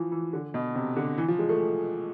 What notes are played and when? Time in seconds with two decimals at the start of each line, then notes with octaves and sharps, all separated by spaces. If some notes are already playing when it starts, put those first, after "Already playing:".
Already playing: E3 F3
0.12 E3
0.33 D3
0.54 B2
0.75 C3
0.96 D3
1.18 E3
1.28 F3
1.39 G#3
1.49 A3